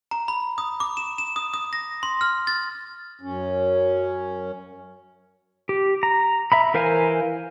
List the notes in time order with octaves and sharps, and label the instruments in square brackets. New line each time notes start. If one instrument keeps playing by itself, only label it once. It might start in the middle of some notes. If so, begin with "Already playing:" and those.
[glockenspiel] A#5
B5
D#6
D6
E7
E7
D#6
D#6
A#6
C6
F6
A6
[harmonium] F#2 C#4
[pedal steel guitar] G4
A#5
E5 A#5 B5
E3 A#4 C5 F5 G#5